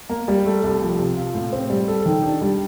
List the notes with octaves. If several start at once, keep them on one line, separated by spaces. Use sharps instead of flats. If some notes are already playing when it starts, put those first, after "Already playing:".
A#3
G3
A3
C2
F3
C3
F4
A2
C4
G3
A4
D#3
D4
G3